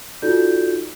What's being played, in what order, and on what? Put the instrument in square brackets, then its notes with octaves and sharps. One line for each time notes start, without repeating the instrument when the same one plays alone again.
[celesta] D#4 F4 F#4 A4 D5 G6